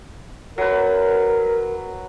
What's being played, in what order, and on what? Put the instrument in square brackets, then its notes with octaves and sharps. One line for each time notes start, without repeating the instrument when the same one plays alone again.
[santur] F#3 B4 [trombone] A#4